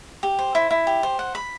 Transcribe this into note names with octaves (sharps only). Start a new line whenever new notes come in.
G4
C5
E4
E4
G4
C5
F#5
B5